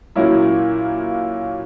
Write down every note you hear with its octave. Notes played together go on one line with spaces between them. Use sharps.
A#2 F#3 A#3 C#4 E4